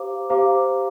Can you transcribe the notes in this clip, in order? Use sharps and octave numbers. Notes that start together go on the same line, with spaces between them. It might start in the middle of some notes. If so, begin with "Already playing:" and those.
Already playing: G4 C5 F5 A#5 D6
G4 C5 F5 A#5 D6